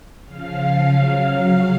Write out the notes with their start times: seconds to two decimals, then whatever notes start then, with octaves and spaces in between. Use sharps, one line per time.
0.25 C#3 F3 F5
0.83 C#3 F#3